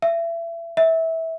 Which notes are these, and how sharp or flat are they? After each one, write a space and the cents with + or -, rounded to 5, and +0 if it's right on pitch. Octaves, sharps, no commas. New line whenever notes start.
E5 +30
E5 -20